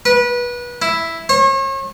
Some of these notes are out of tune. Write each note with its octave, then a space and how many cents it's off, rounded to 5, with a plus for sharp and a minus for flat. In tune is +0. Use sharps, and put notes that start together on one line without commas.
B4 -25
E4 +0
C#5 -40